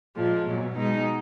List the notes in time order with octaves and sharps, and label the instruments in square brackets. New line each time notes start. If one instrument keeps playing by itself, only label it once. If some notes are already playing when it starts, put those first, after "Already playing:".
[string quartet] A#2 F3 G#3
B2 F#3
B2 G#3 D#4